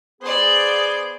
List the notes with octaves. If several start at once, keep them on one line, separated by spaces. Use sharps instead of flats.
B3 G#4 C5 D5